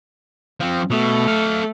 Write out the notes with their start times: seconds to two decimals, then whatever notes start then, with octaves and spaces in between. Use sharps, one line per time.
0.60 F3 C4
0.90 B2 A3
1.28 A4 F5